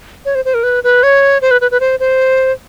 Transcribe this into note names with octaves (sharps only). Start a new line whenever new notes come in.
C#5
C5
C5
A#4
B4
B4
C#5
C5
B4
B4
B4
C5
C5